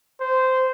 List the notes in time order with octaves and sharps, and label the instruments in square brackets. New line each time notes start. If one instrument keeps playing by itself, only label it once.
[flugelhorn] C5